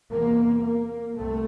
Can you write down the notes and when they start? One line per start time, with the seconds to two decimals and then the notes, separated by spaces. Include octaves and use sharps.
0.10 E2 C3 A#3
0.63 A#3
1.16 C2 C3 A3